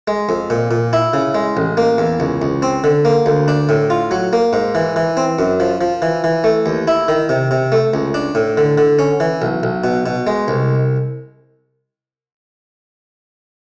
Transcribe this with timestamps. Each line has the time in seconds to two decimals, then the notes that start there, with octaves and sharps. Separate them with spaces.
0.08 G#3
0.29 F2
0.50 A#2
0.71 A#2
0.93 E4
1.13 C#3
1.35 G#3
1.57 A1
1.77 A#3
1.98 E2
2.20 C#2
2.42 C#2
2.62 C4
2.84 D3
3.05 A#3
3.26 D2
3.48 D4
3.69 A2
3.90 F4
4.11 F#3
4.33 A#3
4.53 G#2
4.75 E3
4.96 E3
5.17 C4
5.39 F#2
5.60 F3
5.81 F3
6.02 E3
6.24 E3
6.44 A3
6.66 D#2
6.88 E4
7.08 D#3
7.29 C3
7.51 C3
7.72 A3
7.94 C#2
8.14 D4
8.35 A2
8.57 D3
8.78 D3
8.99 C#4
9.20 E3
9.42 B1
9.63 B1
9.84 B2
10.06 B2
10.27 G#3
10.48 C2